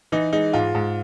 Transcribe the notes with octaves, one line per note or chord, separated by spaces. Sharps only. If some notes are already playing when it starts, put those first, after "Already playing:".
E3 D#4
G#3 D#4
G#2 F4
G#2